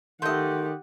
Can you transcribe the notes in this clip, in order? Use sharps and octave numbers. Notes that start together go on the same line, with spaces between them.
D#3 A3 G4 D#5 F#5 C6 G6